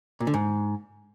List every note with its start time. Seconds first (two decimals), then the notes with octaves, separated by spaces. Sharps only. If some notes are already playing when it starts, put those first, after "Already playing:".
0.20 A#2
0.27 D3
0.34 G#2